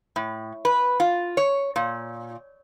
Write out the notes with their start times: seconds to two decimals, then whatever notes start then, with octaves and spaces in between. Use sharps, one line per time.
0.16 A2
0.65 B4
1.00 F4
1.37 C#5
1.76 A#2